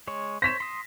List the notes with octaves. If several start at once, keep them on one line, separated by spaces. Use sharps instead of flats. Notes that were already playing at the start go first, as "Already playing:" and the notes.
G#3 C#5
C5 C#5 A#6 B6 E7
C6 D#6